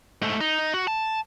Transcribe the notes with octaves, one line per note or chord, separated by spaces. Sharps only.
G#2 A3
D#4
F#4
A5